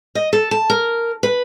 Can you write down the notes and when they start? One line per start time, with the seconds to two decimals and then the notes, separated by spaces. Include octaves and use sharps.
0.15 D#5
0.33 A4
0.51 A5
0.70 A#4
1.23 B4